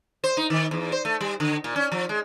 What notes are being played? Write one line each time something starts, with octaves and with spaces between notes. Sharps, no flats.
C5
D#4
D#3
E2
C5
A3
G3
D3
A#2
C#4
F3
G#3